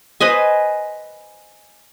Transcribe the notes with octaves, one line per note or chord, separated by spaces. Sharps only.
B4 C5 D#5 G#5